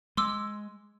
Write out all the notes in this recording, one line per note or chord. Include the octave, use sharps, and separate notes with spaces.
G#3 C6 D6 E6